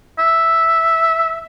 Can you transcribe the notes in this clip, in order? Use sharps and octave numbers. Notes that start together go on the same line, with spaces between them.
E5